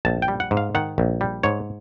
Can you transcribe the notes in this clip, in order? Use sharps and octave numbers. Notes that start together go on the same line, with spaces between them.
A#1 A5
G5
G3
F#5
G#2
F5
D#3 F#5
A#1
G3
G#2 C#5